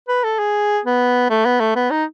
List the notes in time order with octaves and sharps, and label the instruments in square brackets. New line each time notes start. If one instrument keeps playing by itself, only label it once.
[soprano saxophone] B4
A4
G#4
B3
A3
B3
A3
B3
D#4